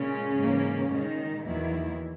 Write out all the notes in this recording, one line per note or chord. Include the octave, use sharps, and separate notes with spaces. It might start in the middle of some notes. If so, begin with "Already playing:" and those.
Already playing: A#2 C#3 G#3 C#4
G#2 E3 A#3
A#2 D#3 G#3 D#4
E2 D#3 E3 F#3 A#3 E4